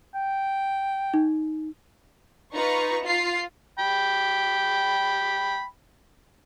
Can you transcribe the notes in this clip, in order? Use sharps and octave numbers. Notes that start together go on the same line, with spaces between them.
G5
D#4
D#4 F4 B4 A#5 C#6
F4 C7
G5 B5